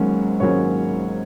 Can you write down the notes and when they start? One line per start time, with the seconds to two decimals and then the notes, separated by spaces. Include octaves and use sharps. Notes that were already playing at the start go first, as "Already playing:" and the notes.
Already playing: G#1 G#2 F#3 A#3 C#4
0.40 G#1 G#2 F#3 A#3 C#4 C#5